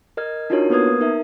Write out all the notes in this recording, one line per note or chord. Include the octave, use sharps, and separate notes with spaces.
A#4 D#5 F6 G#6
D4 D#4 F4 F#4 A#4 C#5
A#3 B3 A#4 B4 D#6 G#6
D#4 A#4 E5